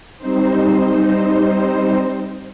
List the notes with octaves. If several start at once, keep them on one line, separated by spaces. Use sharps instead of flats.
G3 C4 D#4 C5